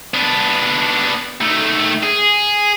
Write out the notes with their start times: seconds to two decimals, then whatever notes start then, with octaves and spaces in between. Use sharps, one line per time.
0.14 B3 D4
1.41 D#3 A3
2.03 G#4